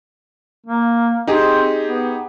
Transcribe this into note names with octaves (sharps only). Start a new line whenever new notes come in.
A#3
C4 D#4 G4 G#4
B3